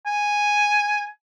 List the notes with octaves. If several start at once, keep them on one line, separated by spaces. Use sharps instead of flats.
G#5